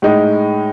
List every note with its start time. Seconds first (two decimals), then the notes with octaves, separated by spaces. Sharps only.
0.02 A2 G#3 D#4